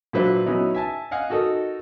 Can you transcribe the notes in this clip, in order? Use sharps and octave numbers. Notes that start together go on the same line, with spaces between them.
A#2 F#3 D4 B4 C5 E5
F#3 B3 C#4 D#4 E4
E5 G#5 A5
D#5 F5 F#5 G#5
D#4 F#4 A4 A#4 D#5